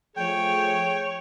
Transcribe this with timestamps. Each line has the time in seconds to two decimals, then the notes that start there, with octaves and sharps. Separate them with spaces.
0.16 F3 A3 G#4 C#5 G5